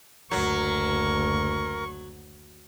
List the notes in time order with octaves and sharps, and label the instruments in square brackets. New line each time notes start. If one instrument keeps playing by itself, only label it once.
[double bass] F#1 D2 [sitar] F#3 [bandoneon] A#4 [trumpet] C#6